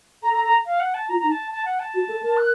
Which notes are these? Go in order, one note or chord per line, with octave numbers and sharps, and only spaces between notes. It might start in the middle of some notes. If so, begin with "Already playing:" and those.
A4 A#5
A#5
A#5
F5
F#5
A5
F4 A#5
D#4 A#5
A5
A5
F#5
A5
F#4
A4
A#4
F#6